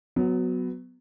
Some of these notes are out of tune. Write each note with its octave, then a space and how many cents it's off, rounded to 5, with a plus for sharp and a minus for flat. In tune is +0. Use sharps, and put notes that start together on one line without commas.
F#3 -5 B3 +15